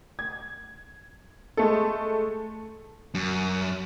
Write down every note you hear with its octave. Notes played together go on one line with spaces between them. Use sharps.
G#6
G#3 A3 A4
F#2